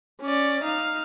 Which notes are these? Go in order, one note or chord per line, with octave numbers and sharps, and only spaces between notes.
C#4 D5
D#4 F5